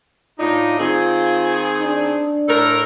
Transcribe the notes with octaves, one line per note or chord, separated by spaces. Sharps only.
A2 D4 D#4 F4
D#3 C4 F4 G#4
D4
A2 A4 A#4